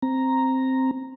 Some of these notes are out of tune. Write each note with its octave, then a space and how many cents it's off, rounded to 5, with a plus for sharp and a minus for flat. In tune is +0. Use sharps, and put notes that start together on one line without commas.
C4 +0 A#5 +0